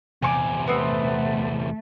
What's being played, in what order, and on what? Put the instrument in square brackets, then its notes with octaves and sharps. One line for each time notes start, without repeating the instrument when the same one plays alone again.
[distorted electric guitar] E2 C3 [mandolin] G#5 C#6 D6
[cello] A3 [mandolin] B3 C4